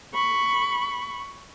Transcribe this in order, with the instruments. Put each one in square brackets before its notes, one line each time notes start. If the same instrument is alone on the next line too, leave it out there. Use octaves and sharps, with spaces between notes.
[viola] B5 C#6